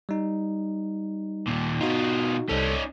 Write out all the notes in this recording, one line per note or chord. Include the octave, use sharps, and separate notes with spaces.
G3 D#4
D#2 A#2
B2 D#4 F4 F#4
C2 C#4 D#4 A4